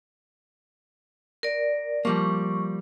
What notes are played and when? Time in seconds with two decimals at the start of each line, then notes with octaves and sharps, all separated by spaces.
1.43 A#4 D5
2.05 F3 G3 A#3 C#6